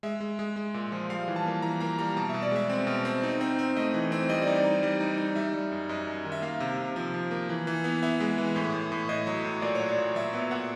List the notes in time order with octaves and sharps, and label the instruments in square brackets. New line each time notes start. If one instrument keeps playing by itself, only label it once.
[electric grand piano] G#3 E5
G#3
G#3
G#3
A#2
F3
G3 F5
E3
A5
A#3
E3 A#5
A#3 A#5
G3 A#5
B2 A5
B2 E5
D5
G#3 E5
C4
B2
C4
D#4
C4
C4
A3 D#5
E3
C4
G3 D#5
D5
D#4
D5
D#4
G3
D#4
D#4
G3 E5
G3
F#2
F#2 D#5
F#2
D#3
E5
A#3 F5
C3
C3
F3
F3
A#3
E3
E3
B3
B3 E5
G#3
E3
A2
A2
A2
A2 D#5
F#3
A2
A#2 D5
F#3 C#5
D5
A#2
F#3 E5
B3 E5
A#2 F#5